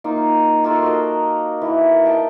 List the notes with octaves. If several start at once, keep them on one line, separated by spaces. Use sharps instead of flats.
A#3 D#4 F4
A#3 F4 A4
F#4 A#4 D#5
E3 A#4
D#5 G5 A5